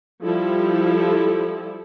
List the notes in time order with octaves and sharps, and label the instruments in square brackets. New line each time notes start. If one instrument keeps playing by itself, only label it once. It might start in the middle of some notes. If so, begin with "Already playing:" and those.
[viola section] F3 G3 E4 A4